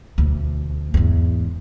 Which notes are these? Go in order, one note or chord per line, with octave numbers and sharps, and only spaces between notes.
D2 B2
E2 G#2